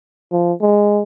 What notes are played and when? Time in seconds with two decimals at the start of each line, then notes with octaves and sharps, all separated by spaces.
0.32 F3
0.61 G#3